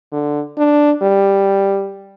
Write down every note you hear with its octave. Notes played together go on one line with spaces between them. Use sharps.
D3
D4
G3